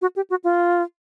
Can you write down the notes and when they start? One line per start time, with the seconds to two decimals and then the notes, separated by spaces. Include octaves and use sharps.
0.02 F#4
0.16 G4
0.30 F#4
0.44 F4